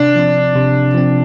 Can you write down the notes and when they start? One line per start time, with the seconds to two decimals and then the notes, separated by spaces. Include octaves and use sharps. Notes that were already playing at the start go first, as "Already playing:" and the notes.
Already playing: C3 D4
0.16 F3 C4
0.56 C3
0.94 F3 C4